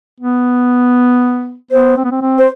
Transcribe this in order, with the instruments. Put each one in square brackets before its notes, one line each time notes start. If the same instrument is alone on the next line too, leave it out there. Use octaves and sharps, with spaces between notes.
[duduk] B3
[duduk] B3 [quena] C5
[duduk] C4
B3
C4
C4
[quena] C5